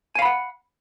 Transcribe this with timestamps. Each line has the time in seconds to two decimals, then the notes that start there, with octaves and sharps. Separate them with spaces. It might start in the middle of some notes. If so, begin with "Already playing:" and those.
0.15 G#5
0.19 F5
0.22 B5
0.25 F#5